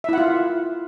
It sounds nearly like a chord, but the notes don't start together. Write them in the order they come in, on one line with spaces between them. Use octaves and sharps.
E5 E4 F#5 F4